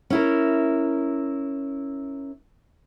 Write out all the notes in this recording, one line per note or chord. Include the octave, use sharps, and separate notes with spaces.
C#4 E4 A#4